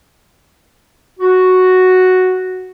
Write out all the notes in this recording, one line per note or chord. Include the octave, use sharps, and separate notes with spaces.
F#4